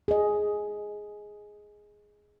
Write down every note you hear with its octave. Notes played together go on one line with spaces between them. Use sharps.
G#4 D#5